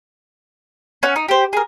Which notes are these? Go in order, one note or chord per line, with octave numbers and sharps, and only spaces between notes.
C#4 F#5
D#4
G4 C5
G#4 A#4